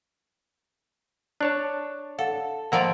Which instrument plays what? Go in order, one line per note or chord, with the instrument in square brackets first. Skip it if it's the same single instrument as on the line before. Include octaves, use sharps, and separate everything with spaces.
[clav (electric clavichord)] D4 C#5 A5 [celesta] F#6
[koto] A4 [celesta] F5 F#5
[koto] D#3 F3 D5 [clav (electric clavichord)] A#3 [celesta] F#5 E6